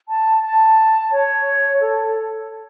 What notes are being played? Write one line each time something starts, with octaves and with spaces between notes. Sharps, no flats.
A5
A5
C#5
A4